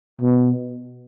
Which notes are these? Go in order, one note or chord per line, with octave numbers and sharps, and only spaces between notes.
B2